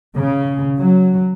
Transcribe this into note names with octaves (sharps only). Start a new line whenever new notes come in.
C#3
F#3